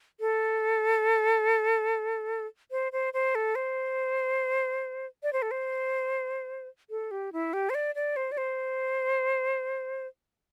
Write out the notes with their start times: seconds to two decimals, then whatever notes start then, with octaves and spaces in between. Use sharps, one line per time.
0.20 A4
2.71 C5
2.92 C5
3.14 C5
3.35 A4
3.55 C5
5.23 D5
5.33 C5
5.42 A4
5.51 C5
6.90 A4
7.11 G4
7.33 E4
7.53 G4
7.70 C5
7.75 D5
7.95 D5
8.16 C5
8.32 D5
8.38 C5